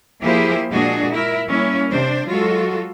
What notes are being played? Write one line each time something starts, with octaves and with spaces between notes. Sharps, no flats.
F3 A#3 E4 G4 G#4 C5
A#2 G#3 D4 F#4 G#4
E4 A#4
G3 A#3 C#4 E4
C3 D4 C5
F#3 G#3 F4 F#4 A4